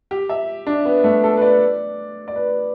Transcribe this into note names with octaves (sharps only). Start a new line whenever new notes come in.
G4
E5
D4
B3
A3
A4
B4
D5
D5
B4